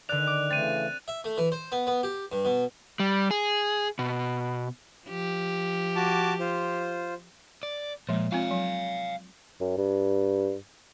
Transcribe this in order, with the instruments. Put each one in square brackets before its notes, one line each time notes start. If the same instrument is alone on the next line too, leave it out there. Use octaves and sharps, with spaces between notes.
[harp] D3 D5 [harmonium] D#3 [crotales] F#6 F7
[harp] D6
[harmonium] C#3 E3 A3 [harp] C4 [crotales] A6 D#7
[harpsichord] E5
A3
E3
C5
B3
B3
G4
G2
B2
[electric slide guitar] G3
G#4
B2
[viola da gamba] F3 G4
[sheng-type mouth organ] F#4 A5 D6
F4 C5
[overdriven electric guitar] D5
[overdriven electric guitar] A#2 [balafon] F3 G#3
[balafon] C4 F4 [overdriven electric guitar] F5 G#5
[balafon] F#3
[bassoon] F#2
G2